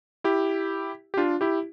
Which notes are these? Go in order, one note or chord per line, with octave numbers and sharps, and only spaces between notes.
E4 G4
G4
D4 F4
E4 G4